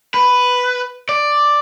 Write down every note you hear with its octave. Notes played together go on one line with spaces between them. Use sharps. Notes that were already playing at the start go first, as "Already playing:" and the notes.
B4
D5